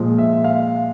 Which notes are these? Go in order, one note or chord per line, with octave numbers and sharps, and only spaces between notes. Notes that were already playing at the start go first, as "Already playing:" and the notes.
Already playing: A#2 F3 G#3
E5
F5